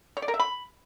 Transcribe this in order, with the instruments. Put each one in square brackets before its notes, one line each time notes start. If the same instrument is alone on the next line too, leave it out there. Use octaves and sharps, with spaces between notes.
[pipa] C#5
D5
A#4
E5
B5